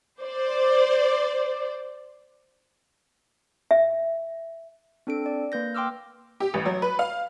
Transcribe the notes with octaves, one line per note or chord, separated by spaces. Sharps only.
C5 D5
E5
C4 D4 A4 D7
D5
A#3 B4 G6 A#6
G5 C6 D6 E6 F6
G4
A1
F#3
B4
F5